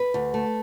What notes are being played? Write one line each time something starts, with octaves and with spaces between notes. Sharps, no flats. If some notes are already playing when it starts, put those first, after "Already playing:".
Already playing: B4
D2
A3